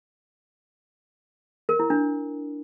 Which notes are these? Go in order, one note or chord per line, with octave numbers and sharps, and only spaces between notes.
A#4
E4
D4